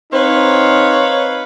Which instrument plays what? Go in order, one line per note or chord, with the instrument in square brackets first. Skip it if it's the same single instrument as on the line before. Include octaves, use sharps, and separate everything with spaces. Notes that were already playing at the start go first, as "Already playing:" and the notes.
[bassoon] C4 [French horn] D#4 [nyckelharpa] B4 F5 [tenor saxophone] C#5